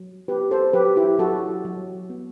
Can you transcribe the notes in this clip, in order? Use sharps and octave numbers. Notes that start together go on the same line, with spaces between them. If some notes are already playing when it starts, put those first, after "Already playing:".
Already playing: F#3
B3 G4 B4
A4 C5
F#3 G4 B4
E4 G4
F#3 F#4 A4
F#3
B3